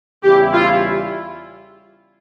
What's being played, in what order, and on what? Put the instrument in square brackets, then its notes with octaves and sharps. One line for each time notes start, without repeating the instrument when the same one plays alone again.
[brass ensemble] E2 C#3 G3 C#4 E4 [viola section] G4
[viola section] F4